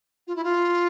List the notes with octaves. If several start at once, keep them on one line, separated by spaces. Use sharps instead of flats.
F4
E4
F4